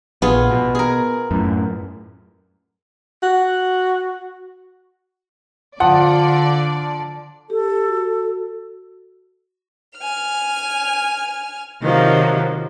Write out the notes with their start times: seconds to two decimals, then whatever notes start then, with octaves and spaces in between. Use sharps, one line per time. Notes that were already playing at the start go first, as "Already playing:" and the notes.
0.22 A#1 B3 F4 G#4
0.51 B2
0.75 G#4 A#4
1.31 F#2 A2
3.23 F#4
5.80 D3 F3 D5 F#5
7.50 G4 A4
7.88 F#4
9.98 G#5 F6
11.81 C3 D#3 F3 F#3 A#3